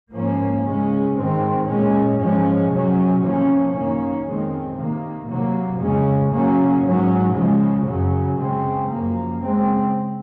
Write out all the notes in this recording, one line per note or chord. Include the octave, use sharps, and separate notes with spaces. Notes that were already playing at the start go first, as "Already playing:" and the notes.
G#2 F3 A#3 C#4
C#3 G#3 C#4
G#2 D#3 G#3 C4
A#2 G#3 C#4
G#2 F3 G#3 C#4
C3 F#3 C#4
C3 F3 A#3 C#4
F#2 D#3 A#3 C#4
F2 D#3 G#3 C4
C3 D#3 A#3
C3 F#3 A#3
F2 C#3 G#3 C#4
C#3 F#3 A#3 C#4
G#2 F#3 C#4
C#3 F3 G#3
F#2 C#3 F#3
C#3 G#3 C4
F#2 F3 A#3
C#3 G#3 C4